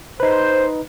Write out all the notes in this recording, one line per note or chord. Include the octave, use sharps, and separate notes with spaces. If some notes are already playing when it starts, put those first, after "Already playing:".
D#4 B4 C5